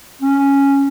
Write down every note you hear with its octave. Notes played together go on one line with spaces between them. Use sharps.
C#4